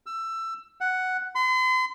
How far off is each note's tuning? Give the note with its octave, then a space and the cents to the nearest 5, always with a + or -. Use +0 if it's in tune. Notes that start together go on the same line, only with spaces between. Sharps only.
E6 +20
F#5 +5
C6 -40